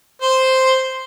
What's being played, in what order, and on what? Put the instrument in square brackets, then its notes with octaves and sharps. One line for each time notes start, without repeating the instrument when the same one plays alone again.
[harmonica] C5